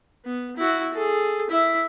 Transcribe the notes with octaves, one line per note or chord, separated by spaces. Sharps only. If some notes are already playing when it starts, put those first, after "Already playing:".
B3
E4 F#4
G#4 A4
E4 E5